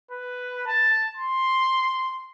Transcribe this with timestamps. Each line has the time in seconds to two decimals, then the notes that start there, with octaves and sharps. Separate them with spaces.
0.11 B4
0.67 A5
1.17 C6